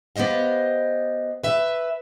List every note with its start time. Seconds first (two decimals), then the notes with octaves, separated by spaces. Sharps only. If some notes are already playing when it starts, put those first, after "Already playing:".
0.16 B3 G4 C5 D#5 F5
1.43 B4 E5